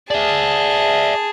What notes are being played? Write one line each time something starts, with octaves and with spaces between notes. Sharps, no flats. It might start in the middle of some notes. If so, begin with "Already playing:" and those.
G#4 D5 E5 A5